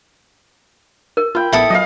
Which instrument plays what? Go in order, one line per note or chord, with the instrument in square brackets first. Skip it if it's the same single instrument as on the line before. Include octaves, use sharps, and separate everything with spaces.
[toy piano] A#4
[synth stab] F4 [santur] G5 B5
[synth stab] A#1 B3 [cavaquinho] E4 A4 D#6
[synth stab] F#3 F4 [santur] D#5 F5